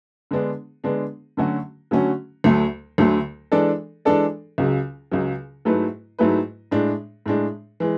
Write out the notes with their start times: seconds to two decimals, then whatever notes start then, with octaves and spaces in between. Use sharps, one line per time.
0.31 D3 G#3 B3 D4
0.84 D3 G#3 B3 D4
1.37 D3 F#3 A3 C#4 F#4
1.91 D3 F#3 A3 C#4 F#4
2.44 D2 D3 F#3 A3
2.98 D2 D3 F#3 A3
3.52 E3 G#3 D4 A4 D5
4.05 E3 G#3 D4 A4 D5
4.58 C#2 C#3 F#3
5.12 C#2 C#3 F#3
5.65 G#2 F#3 A3 E4 B4
6.19 G#2 F#3 A3 E4 B4
6.71 A2 G#3 D4
7.26 A2 G#3 D4
7.80 E3 G#3